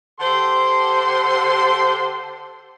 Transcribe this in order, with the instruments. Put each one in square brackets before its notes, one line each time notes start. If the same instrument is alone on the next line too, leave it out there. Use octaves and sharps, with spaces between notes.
[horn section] D3 G4 A4 C5 C6